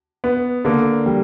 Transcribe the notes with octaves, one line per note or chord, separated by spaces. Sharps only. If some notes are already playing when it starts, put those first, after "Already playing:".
B3
D3 A#3
G3